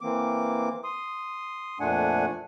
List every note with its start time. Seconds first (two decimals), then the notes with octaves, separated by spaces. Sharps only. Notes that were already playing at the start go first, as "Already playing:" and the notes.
0.01 E3 A#3 C4 D6
0.84 C6 D#6
1.80 F2 A#2 A3 D4 F#5 G#5